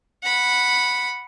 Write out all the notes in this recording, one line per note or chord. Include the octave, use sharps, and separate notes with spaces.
F#5 B5